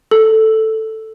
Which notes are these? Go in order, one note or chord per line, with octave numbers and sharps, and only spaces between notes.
A4